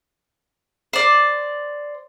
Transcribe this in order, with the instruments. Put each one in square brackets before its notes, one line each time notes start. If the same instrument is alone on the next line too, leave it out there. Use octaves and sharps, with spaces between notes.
[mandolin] C5 D5